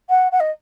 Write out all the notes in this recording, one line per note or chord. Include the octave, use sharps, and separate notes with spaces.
F#5
F#5
D#5